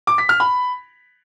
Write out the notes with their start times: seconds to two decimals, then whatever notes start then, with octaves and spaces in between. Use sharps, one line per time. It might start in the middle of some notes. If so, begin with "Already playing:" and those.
0.07 D6
0.18 B6
0.29 F6
0.40 B5